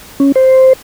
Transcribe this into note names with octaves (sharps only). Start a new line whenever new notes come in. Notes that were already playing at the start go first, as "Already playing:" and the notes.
C#4
C5